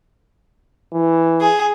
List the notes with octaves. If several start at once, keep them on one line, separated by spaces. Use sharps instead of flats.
E3
G#4